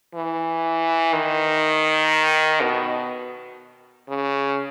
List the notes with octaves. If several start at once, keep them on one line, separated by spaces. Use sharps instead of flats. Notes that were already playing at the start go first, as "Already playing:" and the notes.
E3
D#3
B2
C#3